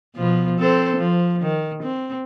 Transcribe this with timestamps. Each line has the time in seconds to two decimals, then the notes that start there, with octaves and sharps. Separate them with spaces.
0.16 B2 F3 B3
0.58 C4 A4 C5
0.97 F3
1.42 D#3
1.83 C4